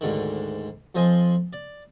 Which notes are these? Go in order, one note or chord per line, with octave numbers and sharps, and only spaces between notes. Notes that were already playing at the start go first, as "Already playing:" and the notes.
D2 G#2 D3 D#3
F2 F3 C5 D#5 G#5
D5